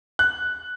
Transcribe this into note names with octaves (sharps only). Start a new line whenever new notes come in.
F#6